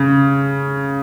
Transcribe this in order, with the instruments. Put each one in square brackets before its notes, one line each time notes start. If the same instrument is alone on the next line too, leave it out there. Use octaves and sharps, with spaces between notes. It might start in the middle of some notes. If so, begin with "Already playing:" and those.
Already playing: [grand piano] C#3